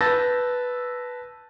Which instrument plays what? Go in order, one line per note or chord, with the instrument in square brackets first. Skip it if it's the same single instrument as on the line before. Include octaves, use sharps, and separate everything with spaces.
[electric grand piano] B4 A5 E6 G6 A6 A#6